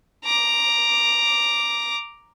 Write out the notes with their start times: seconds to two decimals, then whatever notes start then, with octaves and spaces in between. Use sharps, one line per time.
0.24 A#5 D6